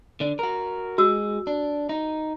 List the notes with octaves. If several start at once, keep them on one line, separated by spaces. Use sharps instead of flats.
D3 D4
F#4 A#4
G#3 F#4 E6
D4
D#4